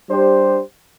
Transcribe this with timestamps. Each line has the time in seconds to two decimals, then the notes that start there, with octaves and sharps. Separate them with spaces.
0.10 G3 D4 G4 C5